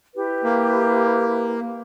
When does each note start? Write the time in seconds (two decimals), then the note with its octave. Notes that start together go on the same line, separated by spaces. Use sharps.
0.15 E4 G4 B4
0.44 A#3